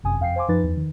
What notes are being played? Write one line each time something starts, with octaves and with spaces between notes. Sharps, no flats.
G1 F#2 C3 G#5 D#6
F2 F5 G5 C7
C5 F5 G#5 C6 D6
F#2 F3 D#4 B4 A6
E2
D#3